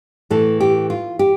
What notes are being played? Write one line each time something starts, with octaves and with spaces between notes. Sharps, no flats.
A2 E3 A3 A4
G4
F4
G4